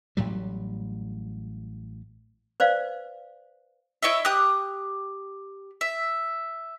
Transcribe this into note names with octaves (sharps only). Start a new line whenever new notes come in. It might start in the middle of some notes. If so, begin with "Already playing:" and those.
A1 A2 F#3 G3
B4 C5 D5 F5
E4 C#5 D#5 E5
G4 D#6 F#6
E5